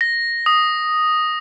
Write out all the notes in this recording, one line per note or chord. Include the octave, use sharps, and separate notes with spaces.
A#6
D#6